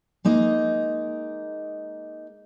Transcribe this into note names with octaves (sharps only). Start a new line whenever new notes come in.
G#3 A#3 D#4 D#5